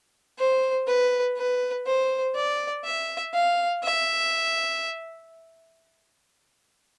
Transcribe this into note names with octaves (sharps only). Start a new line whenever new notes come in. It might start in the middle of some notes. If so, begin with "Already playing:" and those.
C5
B4
B4
C5
D5
E5
F5
E5